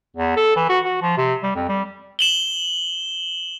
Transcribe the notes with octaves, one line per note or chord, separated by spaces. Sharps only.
E2
A4
E3
F#4
F#4
F3
C3
G3
F2
G3
E7 F#7 G7